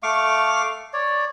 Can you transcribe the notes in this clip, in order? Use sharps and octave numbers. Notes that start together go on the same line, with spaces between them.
A3 F5 C#6 D6
C#5 D5